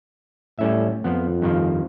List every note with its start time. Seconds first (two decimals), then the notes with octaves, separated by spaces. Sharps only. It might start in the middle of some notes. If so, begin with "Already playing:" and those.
0.59 A2 G3 C#4 E5
1.04 F2 F3 B3
1.42 G2 D#3 F3